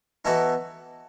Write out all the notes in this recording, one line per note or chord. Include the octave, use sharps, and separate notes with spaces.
E3 B3 D#4 F#4 A4